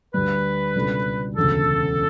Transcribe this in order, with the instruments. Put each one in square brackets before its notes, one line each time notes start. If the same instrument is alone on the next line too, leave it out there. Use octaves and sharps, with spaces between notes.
[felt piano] D2 D3 G3 [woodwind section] B4
[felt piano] C#2 B2 G3 D4 A4
[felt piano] E1 D2 C#3 [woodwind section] A4